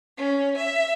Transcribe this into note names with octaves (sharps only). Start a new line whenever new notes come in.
C#4
E5